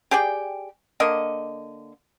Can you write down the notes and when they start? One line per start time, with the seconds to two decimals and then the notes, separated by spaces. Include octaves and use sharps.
0.11 G4 G#4 D5 G5
1.00 D3 A#3 D#5